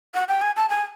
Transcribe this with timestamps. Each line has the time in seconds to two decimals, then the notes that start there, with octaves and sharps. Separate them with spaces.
0.14 F#5
0.28 G5
0.42 G#5
0.56 A5
0.69 G#5